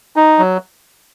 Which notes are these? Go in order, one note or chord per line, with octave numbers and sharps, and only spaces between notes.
D#4
F#3